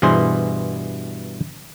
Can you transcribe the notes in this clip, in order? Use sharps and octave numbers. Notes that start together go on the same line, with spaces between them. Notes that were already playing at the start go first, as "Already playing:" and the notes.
G2 B2 E3 G#4 C5